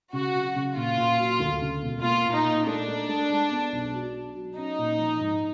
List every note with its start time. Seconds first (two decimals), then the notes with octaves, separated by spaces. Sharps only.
0.13 C#3 F#4
0.35 F#3
0.56 C#3
0.76 A#2 F4
0.97 A#2
1.19 F#3
1.40 D2
1.61 C#3
1.82 E1
2.03 A#3 F4
2.25 A#2
2.35 D#4
2.45 A#2
2.66 A3 D4
2.88 A3
3.09 A3
3.30 G#3
3.51 B3
3.72 B1
3.94 F#3
4.14 F#3
4.35 F#3
4.57 C#4 D#4
4.78 A#2
4.99 F3
5.20 G#2